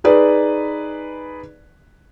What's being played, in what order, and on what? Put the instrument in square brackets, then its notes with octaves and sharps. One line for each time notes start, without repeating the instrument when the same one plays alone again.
[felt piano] D#4 G#4 B4 D5